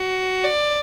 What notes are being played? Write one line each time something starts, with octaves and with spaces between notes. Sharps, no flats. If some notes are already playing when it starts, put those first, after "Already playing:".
Already playing: F#4
D5